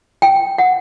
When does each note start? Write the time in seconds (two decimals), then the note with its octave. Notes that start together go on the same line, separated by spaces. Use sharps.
0.22 G5
0.58 F#5